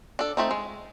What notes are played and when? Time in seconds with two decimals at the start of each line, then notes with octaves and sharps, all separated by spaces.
0.19 D4 A4
0.37 A3 C4 D#4
0.51 G#3